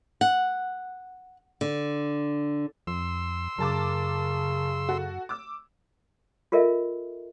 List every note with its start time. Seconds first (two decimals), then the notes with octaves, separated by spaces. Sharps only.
0.21 F#5
1.61 D3
2.87 F2 C6 E6
3.59 F#2 C#3 A#4 A5 D6
4.89 F#4 A4
5.29 D6 E6
6.52 F4 A4 A#4 D#5 E5